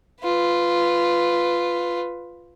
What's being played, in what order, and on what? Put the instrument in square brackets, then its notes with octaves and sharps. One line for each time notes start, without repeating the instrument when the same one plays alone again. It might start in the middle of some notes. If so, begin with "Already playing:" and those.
[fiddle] F4 B4